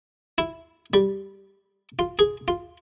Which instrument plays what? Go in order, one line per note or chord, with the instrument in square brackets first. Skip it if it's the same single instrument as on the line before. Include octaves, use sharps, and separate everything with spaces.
[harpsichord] E4
G3
F4
G#4
F4